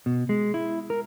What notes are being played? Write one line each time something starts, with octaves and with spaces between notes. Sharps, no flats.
B2
G#3
E4
A#4